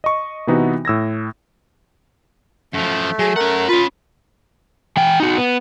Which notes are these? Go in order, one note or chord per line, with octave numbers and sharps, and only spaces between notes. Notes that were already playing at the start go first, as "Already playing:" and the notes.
D#5 C#6
C3 E3 B3 D#4 E4 F#4
A2 E6 G#6 A#6
F#2 F3 A3
F#3 G#4
C#4 A#4 F#5
C#4 F4 B4
E3 G5
D#4 F#4
B3